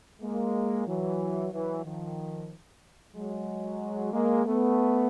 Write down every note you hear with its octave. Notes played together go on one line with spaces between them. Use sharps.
G#3 A#3
E3 F#3
E3 F#3
D#3 F3
F#3 G#3
G#3 A#3
A3 B3